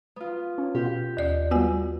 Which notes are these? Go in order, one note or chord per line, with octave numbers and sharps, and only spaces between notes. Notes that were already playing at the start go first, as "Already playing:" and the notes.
B3 F4
C#4
B2 F4 G4
D#2 D5 D#5
G3 B3 F4 F#4 G#5